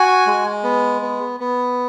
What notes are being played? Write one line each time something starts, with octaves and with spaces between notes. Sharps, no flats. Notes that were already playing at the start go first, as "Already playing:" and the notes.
Already playing: F#4 G#5
G#3
B3
B3
B3